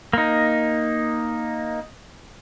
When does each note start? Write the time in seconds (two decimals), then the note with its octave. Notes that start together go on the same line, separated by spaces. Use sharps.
0.13 A#3 D#4